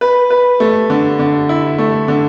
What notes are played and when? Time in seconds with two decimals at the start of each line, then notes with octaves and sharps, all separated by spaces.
0.01 B4
0.30 B4
0.60 A3
0.90 D3
1.19 D3
1.49 E4
1.78 A3
2.08 D3